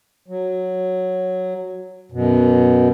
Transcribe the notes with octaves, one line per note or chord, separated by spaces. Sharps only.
F#3
F#2 B2